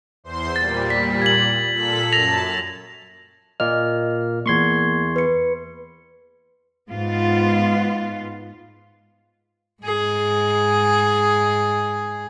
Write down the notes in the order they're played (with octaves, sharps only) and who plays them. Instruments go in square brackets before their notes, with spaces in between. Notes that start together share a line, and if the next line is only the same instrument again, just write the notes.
[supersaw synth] E2 C5 C6
[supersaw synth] A#2 G3 [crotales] A6
[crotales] B6
G#6 F#7
[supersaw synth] A#2 A4 B6
[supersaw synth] F#2 A5 [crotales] A#6 F7
[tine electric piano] A#2 A#3 F6 [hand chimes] D#5
[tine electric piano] E2 C6 C#6 [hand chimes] A#3 G#6
[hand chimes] B4 C#7
[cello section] G#2 B3 F4
[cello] G#2 G#4